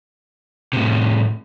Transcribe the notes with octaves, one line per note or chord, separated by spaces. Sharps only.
A2 C3